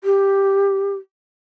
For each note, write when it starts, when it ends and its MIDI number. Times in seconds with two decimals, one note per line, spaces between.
0.04 0.95 67